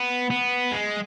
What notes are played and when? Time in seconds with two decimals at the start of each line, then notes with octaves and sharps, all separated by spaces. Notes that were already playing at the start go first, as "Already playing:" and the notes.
Already playing: B3
0.30 B3
0.72 G#3